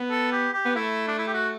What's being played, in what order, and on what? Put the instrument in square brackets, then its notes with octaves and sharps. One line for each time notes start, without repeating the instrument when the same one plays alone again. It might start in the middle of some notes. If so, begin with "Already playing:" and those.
Already playing: [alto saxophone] B3
[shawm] A4
G4
G4
[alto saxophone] B3
[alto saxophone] A3 [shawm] E4
[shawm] D4
E4
G4
F#4